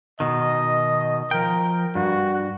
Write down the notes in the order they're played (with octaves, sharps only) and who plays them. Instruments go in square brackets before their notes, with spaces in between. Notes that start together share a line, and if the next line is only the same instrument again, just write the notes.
[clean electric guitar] B2 D#3 [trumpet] D#5
[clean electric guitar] F3 G5 [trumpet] A#4
[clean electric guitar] G2 [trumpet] F#4